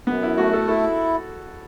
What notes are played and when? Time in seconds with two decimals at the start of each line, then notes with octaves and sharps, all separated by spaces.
0.07 F#2 B3
0.23 E4
0.37 A3 F#4
0.53 A4
0.68 E4 A4